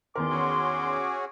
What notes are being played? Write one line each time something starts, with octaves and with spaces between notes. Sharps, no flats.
E2 D#3 A#4 C6 D6
C#4 F#4 G#4